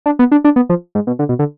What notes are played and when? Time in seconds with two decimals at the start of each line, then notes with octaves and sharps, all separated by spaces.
0.06 D4
0.19 B3
0.32 D4
0.44 D4
0.56 B3
0.69 F3
0.95 G#2
1.07 B2
1.19 D3
1.29 B2
1.39 D3